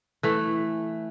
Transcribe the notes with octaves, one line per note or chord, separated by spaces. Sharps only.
E3 A3